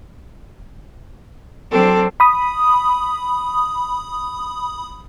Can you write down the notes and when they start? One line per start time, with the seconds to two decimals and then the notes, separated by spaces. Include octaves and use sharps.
1.71 F#3 C4 D4 A4
2.20 B5 D#6